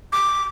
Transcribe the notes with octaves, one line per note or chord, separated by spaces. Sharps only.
D6